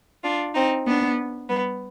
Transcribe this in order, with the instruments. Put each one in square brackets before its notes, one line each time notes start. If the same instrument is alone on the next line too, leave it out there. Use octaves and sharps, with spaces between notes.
[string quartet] D4 F4
C4 D#4
B3 D4
G3 B3